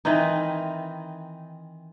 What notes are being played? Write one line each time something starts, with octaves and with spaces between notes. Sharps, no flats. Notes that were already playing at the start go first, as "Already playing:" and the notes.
D#3 E3 C4 D#4